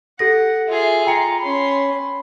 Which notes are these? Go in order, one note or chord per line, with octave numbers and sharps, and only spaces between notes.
G4 A4 F#5 A#6
F4 G#4 E5
F4 G5 A#5 C#7
C#4 B5 C6